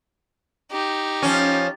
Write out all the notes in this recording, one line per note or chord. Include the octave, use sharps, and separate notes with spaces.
D#4 G4
F3 C#4